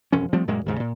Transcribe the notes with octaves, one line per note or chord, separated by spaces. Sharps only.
E1 F2 C#4
F3 G3 A3 C4
F#2 A#2 G#3 A#3
D#2 G#2 C#3
A#2